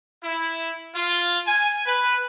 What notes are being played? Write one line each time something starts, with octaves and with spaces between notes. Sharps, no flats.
E4
F4
G#5
B4